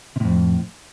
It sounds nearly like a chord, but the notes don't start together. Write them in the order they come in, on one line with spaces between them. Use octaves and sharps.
C3 A2 F2